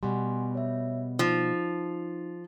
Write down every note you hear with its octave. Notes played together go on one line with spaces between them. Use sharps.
B2 G3 F#5 G#5 C6
C#5 E5
F3 D#4